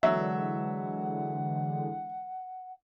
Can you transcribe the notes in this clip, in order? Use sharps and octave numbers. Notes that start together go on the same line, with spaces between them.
D3 E3 F#3 G#3 E5 F#5